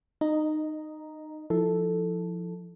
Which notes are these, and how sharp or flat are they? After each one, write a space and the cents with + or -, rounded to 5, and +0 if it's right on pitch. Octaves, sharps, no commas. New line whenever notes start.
D#4 -20 D#5 +0 A#5 +0
F3 +0 E4 -25 A4 +0